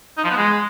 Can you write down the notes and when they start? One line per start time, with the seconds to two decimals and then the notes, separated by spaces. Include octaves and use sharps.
0.18 D#4
0.24 F3
0.31 B3
0.37 G#3